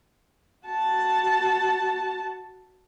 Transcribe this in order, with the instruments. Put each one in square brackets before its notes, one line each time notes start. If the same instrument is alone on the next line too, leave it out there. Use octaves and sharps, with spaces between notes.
[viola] F#4 A5